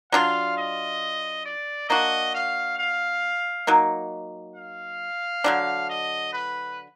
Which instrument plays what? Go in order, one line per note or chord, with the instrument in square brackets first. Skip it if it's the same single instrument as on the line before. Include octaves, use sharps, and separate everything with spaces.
[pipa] F#3 D4 F4 [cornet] F5
[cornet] D#5
D5
[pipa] A#3 D4 F#4 [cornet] D#5
[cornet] F5
F5
[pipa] F#3 A#3 D#4
[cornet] F5
[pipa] D3 F#3 D4
[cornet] D#5
B4